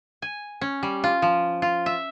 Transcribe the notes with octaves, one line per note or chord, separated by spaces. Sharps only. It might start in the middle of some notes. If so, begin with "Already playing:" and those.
G#5
C#4
G3
F4
F3
F4
E5